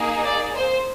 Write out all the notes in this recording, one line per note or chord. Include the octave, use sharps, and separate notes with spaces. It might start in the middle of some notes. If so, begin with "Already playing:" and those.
Already playing: A#3 D#4 G#4
D5
C5